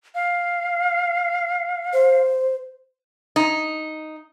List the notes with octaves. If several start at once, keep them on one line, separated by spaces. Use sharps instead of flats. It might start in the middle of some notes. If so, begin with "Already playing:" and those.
F5
C5
D#4